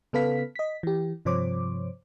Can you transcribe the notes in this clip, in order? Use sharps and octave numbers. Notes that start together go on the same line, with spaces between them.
C#3 B3 A4 B4 F5 B6
D#5 B6
E3 G4
G2 C3 F3 C5 C#5 D6